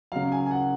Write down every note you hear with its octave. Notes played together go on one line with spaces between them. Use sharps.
C#3 F#3 F5
G#5
G#5
F#5